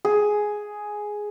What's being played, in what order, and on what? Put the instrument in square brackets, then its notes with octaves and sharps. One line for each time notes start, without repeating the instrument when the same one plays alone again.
[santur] G#4